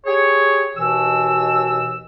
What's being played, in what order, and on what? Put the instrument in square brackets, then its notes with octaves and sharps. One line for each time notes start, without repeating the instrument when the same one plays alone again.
[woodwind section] G4 G#4 C#5
D#2 B2 E3 E6